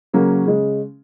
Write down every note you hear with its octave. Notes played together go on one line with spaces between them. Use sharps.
C#3 F#3 A#3 C#4
C#3 G#3 C#4